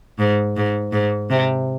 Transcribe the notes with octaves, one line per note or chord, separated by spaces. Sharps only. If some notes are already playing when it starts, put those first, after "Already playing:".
G#2
G#2
G#2
C3